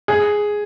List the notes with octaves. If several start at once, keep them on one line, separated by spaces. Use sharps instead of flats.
G#4